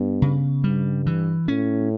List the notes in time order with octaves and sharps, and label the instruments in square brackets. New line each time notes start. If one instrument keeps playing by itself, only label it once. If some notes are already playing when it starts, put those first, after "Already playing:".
Already playing: [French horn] G2 [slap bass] B3
[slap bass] C#3
[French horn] G2 [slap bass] G3
[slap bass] E3
[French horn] A2 [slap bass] C#4